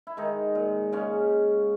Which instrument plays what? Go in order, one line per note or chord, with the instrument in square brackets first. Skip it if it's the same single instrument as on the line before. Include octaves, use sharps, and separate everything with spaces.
[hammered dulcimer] E4
D#3 G#3 D#4
A#2
C#3 G#3 C#4